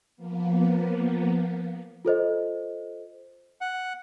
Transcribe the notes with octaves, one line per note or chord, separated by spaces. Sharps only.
F3 A#3 B3
F4 A4 C5 D#5
F#5